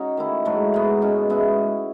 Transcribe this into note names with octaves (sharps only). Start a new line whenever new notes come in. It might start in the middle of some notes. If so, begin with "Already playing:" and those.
Already playing: C#4 D#4 F#4 C#5
D#3 A3 E4
G#2 F#3 A3
G#2 F#3 B3
B2 G#3 C#4
G#3 B3 E4